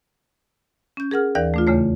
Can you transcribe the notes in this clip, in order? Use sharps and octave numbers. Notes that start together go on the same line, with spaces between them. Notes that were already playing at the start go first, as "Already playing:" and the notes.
C#4 G6
G#4 A#4 F#5 F6
D#2 E3 A#4 D5 F5
A3 D4 F4
E2 C#3 A3 C#5